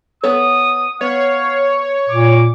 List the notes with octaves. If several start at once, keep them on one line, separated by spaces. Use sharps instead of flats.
B3 A4 C#5 D#6
B3 C#5 F5
A#2 D6